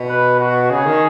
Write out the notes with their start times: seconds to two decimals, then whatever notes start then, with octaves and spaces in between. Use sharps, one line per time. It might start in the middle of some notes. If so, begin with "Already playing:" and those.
Already playing: B2
0.09 B4
0.40 F#4
0.70 C#3 G#4
0.86 D#3